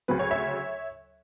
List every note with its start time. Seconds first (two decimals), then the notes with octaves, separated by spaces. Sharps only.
0.08 D2 C#3 F#3 B4
0.19 C#5
0.31 C#5 E5